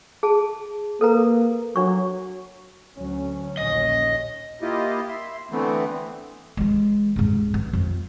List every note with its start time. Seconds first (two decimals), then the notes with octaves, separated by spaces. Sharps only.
0.23 G#4 A5
1.01 A#3 A4 B4 A#5
1.76 F#3 D4 C#6
2.94 D2 F#3 C#4
3.57 A#1 D#2 C#4 D#5
4.62 A#3 E4 F4 G4 D#5
5.08 E5 C6
5.51 D3 E3 A3 B3 C4
6.57 E3 G#3
7.16 C#2 G#2
7.54 B3
7.73 F2